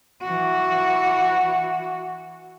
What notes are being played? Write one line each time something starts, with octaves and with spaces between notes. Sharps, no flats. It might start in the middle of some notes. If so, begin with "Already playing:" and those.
E3 F#4